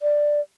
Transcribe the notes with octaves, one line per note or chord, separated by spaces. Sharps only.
D5